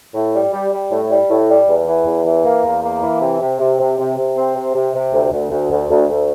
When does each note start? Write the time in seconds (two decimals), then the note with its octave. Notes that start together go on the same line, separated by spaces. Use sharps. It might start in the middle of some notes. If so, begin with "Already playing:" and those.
0.14 A2
0.34 G3
0.53 G3
0.73 G3
0.91 A2
1.11 G3
1.30 A2
1.49 G3
1.68 E2
1.87 E3
2.06 E2
2.26 E3
2.45 A#3
2.64 E2
2.83 A#3
3.03 E3
3.21 C3
3.41 C3
3.60 C3
3.79 C3
3.98 C3
4.17 C3
4.37 C4
4.56 C3
4.75 C3
4.94 C3
5.13 D2
5.32 D2
5.51 D2
5.71 D2
5.90 D2
6.09 D2